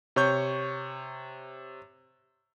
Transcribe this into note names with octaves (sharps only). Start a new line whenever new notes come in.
C3 C#5 C#6 G6